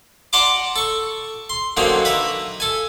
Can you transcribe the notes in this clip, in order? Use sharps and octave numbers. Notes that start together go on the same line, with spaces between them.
D5 F#5 A5 A#5 C6 D6
A4 C#6
C6
D3 F#3 A#3 C4 C#4 D#4
B4 E5 A#5
A4 G#5